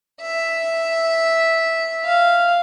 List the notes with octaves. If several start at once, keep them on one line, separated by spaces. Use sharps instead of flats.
E5
F5